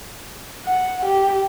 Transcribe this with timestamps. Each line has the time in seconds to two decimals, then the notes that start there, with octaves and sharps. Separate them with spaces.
0.65 F#5
1.05 G4